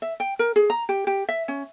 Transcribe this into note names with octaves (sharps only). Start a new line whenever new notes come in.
E5
G5
A#4
G#4
A#5
G4
G4
E5
C#4